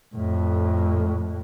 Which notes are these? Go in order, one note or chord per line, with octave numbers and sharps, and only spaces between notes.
F2 A2